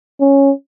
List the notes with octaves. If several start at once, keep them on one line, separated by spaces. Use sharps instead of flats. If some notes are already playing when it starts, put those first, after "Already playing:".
C#4